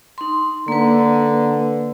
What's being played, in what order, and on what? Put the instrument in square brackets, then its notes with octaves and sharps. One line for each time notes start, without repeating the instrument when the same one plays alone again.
[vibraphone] D#4 C6
[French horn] D3 [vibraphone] A#3 B4